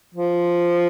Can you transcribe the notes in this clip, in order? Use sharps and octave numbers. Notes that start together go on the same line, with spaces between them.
F3